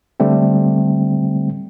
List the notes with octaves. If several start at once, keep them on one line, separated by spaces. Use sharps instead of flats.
D3 G3 A3 C4